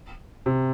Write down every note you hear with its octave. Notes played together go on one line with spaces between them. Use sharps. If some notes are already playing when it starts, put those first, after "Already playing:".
C3